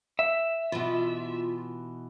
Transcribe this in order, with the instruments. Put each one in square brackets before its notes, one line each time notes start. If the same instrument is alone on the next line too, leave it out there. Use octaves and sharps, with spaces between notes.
[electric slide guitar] E5
[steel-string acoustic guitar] B2 E3 [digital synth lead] F4